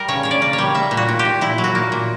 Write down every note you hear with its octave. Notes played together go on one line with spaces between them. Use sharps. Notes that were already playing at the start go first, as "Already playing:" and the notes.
Already playing: G3 A#4
C#3 C#5
C#3 C#5
D5
A#3
C#5
G3
A#3 E5
A#2
F#4
A#2
G4
A#2
A#2 E4
F#3
F#4
A#3
A#2